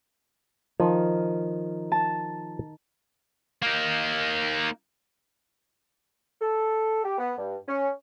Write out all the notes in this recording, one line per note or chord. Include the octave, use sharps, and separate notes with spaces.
D#3 F3
A5
A#3 D#4
A4
G4
B3
G2
C#4